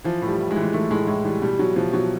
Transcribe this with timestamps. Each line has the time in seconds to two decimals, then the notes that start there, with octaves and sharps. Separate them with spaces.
0.04 E3 F3
0.22 A2
0.27 G3
0.39 A2
0.51 G#3
0.56 E3
0.63 G#3
0.73 E3 A3
0.91 A2 G#3
1.07 A2 G#3
1.24 E3 G3
1.42 B2 G3
1.59 B2 F#3
1.76 B2 F3
1.93 B2 F#3